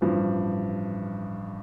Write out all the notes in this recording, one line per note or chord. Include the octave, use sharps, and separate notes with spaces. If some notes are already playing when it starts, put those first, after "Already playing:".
A1 G2 F3